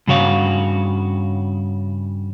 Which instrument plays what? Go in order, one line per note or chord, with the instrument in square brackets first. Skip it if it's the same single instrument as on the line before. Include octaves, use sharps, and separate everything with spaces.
[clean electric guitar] G2 C#3 F#4 C#5 F5